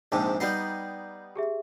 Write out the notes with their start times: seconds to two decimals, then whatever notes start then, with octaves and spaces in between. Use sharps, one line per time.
0.12 A#1 G#2 C3 A5 D6
0.40 G3 B3 D#4 G6 C7
1.36 G4 G#4 E5